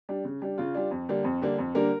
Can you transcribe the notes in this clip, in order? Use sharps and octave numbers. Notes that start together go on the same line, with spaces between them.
G3 D4
C#3
G3 D4
C#3 F4
G3 D4
F2
D3 G3 A#3 D4
F2
D3 G3 A#3 D4
F2
D3 G3 A#3 D4 A#4